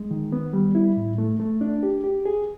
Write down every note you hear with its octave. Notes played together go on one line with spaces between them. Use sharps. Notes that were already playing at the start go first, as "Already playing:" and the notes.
Already playing: G#3
D#3
B3
G3
E4
A2
A3
A3
D4
G4
G4
G#4